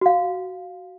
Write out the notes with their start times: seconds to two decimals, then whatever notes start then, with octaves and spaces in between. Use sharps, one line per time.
0.01 F#4 F5